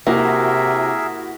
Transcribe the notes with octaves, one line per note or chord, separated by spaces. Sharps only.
C3 A#3 E4 F#4 G#4 A#4 E5